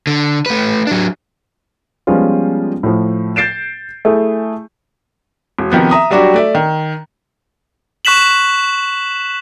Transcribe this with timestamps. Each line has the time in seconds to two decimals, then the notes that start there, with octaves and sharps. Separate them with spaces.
0.07 D3
0.46 A3 B4
0.87 F#3 D4
2.07 F3 G3 G#3 B3 C#4 F4
2.83 A2 F3
3.36 G6 A6 C7 D7 E7
4.05 A3 E4 G#4
5.59 E1
5.72 C3 D#3 F3 B3
5.91 E5 A#5 D#6
6.10 F#3 G3 D4 F#4 G4
6.34 A3 D5 E5
6.55 D#3
8.05 C#6 F#6 B6 E7 F#7